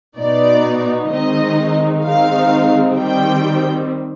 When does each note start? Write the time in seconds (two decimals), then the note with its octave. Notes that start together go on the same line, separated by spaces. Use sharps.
0.17 B2 B3 D#4 D5
1.10 D#3 G#3 C4 D#4 D#5
2.04 D#3 G#3 C4 D#4 F5
2.98 D#3 G3 C4 G5